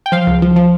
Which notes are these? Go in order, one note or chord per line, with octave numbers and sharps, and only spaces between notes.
G5
F3 F5
C#2
F3
F3